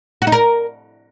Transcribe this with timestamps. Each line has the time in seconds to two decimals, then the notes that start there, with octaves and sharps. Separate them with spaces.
0.22 F#4
0.27 D#4
0.32 A#4